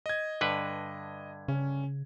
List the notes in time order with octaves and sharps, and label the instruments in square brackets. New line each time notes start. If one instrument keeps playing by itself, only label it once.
[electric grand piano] D#5 G#6
[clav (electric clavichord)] G2 D3 B4
[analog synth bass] C#3 [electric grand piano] C#4